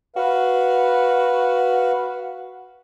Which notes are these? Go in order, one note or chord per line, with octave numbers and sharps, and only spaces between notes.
F#4 B4 F5